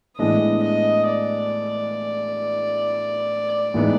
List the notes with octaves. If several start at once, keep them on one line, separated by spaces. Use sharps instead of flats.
A2 E3 G#3 B3 D4 D#5
D#5
D5
A2 E3 G#3 B3 D#4